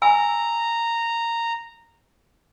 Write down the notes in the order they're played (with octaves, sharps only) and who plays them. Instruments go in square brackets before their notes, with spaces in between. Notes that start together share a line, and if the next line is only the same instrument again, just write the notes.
[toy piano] G#5 E6 [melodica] A#5